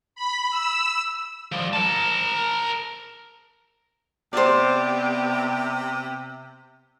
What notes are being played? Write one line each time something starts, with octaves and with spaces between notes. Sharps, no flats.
B5
E6
F3 G3
A#4 A5
C3 B3 G4 C5 D5